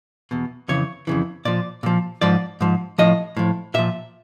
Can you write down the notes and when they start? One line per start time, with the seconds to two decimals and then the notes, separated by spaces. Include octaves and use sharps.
0.31 E2 B2
0.68 F2 C#3 E3 C#5
1.07 F2 C#3 E3
1.45 A#2 F3 D5
1.83 A#2 F3
2.21 G#2 F3 D5
2.61 G#2 F3
2.98 A2 F3 D#5
3.37 A2 F3
3.74 A#2 F3 E5